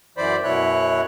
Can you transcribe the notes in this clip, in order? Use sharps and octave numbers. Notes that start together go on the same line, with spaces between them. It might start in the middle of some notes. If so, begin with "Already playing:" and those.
F#2 E3 C5 D5 B5
F#2 B2 E4 C#5 F#6